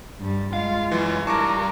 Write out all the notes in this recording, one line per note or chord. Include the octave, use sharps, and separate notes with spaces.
G2 G3
G#3 F4 F5
F#2 E3
G3 A#4 A5 C#6 D6 A#6